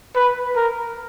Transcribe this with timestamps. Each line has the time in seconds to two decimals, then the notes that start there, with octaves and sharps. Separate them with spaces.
0.15 B4
0.56 A#4